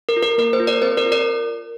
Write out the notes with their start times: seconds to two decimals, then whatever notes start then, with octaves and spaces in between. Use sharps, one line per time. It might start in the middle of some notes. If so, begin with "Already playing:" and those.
0.09 A#4
0.16 F4
0.23 A#4
0.38 A#3 A#4
0.53 C5
0.60 F4
0.67 A#4 D5
0.82 C4 C5
0.97 A#4 D5
1.05 F4
1.12 A#4 D5